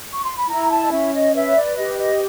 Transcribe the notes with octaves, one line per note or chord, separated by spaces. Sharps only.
C#6
C6
B5
E4 A#5
A5
D#5
C#4 E5
D#5
B4 E5
C#5
D5
G4 D#5
D#5